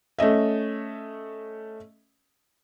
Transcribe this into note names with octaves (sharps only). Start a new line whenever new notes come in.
A3 C#4 D#5 E5